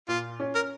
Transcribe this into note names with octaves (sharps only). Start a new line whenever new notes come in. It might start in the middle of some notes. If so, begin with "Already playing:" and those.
A#2 F4
C#4
A#4